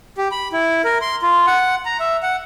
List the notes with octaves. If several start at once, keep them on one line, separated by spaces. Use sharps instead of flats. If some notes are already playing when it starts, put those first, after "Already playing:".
G4
B5
E4
A#4
C6
F4
F#5
A#5
E5
F#5